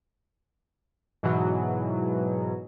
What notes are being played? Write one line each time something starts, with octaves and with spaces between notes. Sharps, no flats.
G#2 B2 E3 F#3